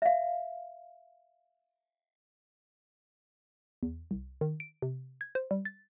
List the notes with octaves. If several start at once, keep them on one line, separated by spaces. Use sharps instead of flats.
E5 F5
E2
C2
D#3
D7
C3
G#6
C5
G3
A6